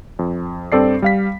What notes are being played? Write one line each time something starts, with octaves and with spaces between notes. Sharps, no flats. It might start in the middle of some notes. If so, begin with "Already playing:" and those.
F2
G2 C4 A4 D5 C7
G3 F5 B6